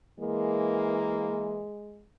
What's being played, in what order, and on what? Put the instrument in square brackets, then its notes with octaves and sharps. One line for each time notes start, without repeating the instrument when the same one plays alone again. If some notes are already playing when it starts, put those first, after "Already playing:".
[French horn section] E3 A#3 [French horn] G#3